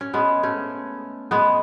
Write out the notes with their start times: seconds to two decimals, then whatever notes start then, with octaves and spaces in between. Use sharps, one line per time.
0.01 C#4
0.14 G#3 B3
0.43 A3 C#4
1.31 G#3 B3